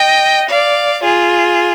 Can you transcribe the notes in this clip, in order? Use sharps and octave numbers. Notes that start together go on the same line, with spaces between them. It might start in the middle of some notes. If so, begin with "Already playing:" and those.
Already playing: D#5 G5
D5 F5
F4 G#4